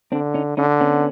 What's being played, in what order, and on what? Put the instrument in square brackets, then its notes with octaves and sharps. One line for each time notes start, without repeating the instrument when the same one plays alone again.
[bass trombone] D3 [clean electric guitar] C4 D4
[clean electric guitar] C#4 D#4
[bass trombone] D3 [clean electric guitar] C#4 D#4
[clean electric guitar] B3 C#4